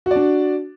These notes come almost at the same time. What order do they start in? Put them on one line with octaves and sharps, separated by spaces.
F#4 D5 D4